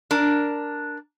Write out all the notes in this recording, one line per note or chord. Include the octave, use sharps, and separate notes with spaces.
D4 A#4